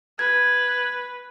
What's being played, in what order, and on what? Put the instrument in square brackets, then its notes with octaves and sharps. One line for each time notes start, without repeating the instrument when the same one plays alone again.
[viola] B4 [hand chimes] G#6